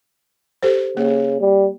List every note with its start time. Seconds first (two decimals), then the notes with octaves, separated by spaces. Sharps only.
0.63 G4 A4 C5
0.97 C#3 A#3
1.40 G3